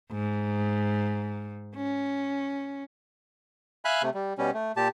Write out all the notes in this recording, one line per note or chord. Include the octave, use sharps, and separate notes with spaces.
G#2
C#4
E5 F5 G#5 B5 F#6
C3 A3
G3
B2 G3 C#4
A3
A#2 G4 A5